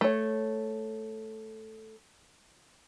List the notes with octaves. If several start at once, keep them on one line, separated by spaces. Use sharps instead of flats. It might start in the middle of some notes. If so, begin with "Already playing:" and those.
A3 C#5